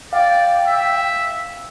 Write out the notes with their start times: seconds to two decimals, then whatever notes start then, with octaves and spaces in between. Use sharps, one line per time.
0.13 D5 F5 G5
0.66 E5